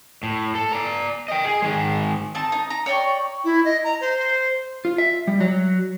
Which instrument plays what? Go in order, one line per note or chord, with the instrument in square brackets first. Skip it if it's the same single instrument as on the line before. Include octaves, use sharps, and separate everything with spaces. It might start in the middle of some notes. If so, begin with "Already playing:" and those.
[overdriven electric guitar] A2
A4
D5 A#5
D#5 G5
G#4
D#3 G#3
[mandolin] C4 D#4 A5
D#4
A#5
C#5 D5 G5 C#6
[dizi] E4
D#5
A#5
C5
[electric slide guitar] F4
E5
G3
F#3